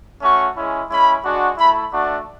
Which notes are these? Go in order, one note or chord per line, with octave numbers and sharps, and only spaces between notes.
A3 C#4 F#4 C#6
G#3 C#4 E4
G#3 C#4 E4 B5
G#3 D4 F#4
A3 E4 B5
A3 D4 F#4